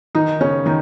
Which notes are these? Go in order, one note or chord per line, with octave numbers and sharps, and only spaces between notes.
D#3 D#4
C#3 C#4
D#3 D#4